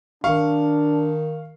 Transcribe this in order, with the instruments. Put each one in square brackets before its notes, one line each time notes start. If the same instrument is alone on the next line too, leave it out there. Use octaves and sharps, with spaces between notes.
[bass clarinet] D#3 [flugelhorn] D4 [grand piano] F5 C#6